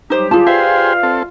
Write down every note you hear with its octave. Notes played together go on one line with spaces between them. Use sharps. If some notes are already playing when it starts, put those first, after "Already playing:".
F#3 G3 D#4 G4 C5
F4 G#4 A5
G4 G#4 B4 C5 D5 E5 F5
C4 A4